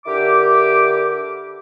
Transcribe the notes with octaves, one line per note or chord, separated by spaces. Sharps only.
D3 E4 G4 A#4 D6